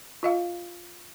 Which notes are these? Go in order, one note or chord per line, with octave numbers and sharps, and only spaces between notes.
F4 D#5 F5